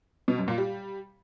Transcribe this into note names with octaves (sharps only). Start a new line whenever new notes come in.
B2
F#2
A#2
G3